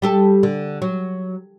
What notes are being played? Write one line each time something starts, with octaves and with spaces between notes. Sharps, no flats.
G3 G4 A4
D3
F#3